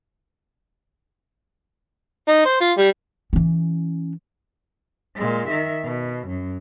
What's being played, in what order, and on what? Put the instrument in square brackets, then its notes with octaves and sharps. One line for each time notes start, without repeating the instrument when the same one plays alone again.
[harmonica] D#4
C5
F4
G3
[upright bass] E3 C#4
[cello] A#2 G#3
D#3 E5
B2
F#2